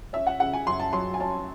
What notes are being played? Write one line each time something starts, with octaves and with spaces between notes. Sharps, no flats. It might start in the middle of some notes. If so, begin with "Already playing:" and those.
C#4 E5
F#5
C#3 F#5
G#5
F#2 C6
A5
F#3 C6
G#5
C#4 A5